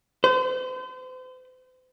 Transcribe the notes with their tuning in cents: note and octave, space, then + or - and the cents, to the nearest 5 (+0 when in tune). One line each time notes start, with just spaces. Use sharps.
C5 -40